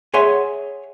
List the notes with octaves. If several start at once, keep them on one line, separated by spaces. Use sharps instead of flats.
G#4 C#5 E5 F#5 G#5 C6